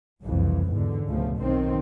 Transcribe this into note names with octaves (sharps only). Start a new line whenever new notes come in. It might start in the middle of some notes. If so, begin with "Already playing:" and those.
F#1 C2 F2 E3
E2 G#2 B2 D3
C#2 B2 F3 A3
B1 D#3 C4